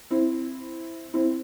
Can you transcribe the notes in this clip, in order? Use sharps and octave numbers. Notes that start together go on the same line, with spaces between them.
C4 E4
C4 E4